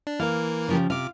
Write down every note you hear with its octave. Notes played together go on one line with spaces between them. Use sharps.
D4
E3 A#3 A#4 F5
C#3 F3 G4
C3 F4 F5 D6